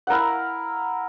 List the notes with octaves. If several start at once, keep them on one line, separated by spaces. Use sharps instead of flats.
E4 A#4 F5 F#5